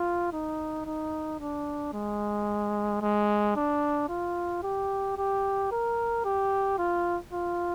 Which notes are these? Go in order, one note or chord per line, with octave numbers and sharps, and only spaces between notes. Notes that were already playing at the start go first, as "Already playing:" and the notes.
Already playing: F4
D#4
D#4
D4
G#3
G#3
D4
F4
G4
G4
A#4
G4
F4
F4